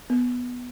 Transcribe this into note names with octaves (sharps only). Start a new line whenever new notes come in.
B3